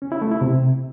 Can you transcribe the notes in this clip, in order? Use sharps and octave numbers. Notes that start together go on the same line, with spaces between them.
C#4
E4
A3
E4
C3